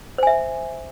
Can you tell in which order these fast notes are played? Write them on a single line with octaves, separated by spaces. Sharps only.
C5 G#5 E5